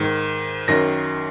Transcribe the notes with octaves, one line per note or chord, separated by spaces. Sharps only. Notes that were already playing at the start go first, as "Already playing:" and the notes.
Already playing: G#2 D#3
F#2 D#3 A#6